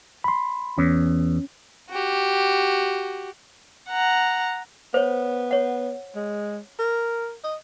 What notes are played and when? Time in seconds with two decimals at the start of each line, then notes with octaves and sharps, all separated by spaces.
0.24 B5 C6
0.78 E2 C#4
1.90 F#4 G4
3.90 F#5 A#5
4.94 B3 C5 C#5
5.51 C#5 F#5
6.15 G#3
6.79 A#4
7.44 D#5